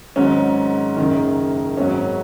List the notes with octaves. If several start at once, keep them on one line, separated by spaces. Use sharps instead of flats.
G#1 G#2 F#3 C#4
F#1 F#2 D#3
G#1 F#2 F#3 C#4